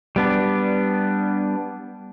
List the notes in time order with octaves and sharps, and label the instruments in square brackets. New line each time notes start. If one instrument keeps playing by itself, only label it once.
[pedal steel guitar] G3 B3 D4